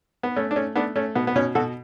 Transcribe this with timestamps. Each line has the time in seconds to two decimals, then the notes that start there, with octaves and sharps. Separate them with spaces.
0.23 B3
0.36 A3 C#4
0.51 D4
0.56 A3 C#4
0.75 A3 B3 D4
0.96 A3 C#4
1.15 B2 B3
1.27 B3
1.35 B2 C#4
1.55 B2 F#4 A4